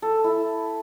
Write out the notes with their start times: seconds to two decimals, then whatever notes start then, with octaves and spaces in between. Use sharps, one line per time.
0.02 A4
0.24 E4